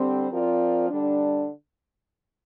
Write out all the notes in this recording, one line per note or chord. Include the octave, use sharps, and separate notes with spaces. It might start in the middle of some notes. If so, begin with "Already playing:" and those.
Already playing: D3 G3 C4 G4
F3 C4 F4 A#4 D5
D3 G3 D4